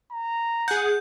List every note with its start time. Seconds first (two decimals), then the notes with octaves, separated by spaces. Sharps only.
0.12 A#5
0.68 G#4 F#5 G6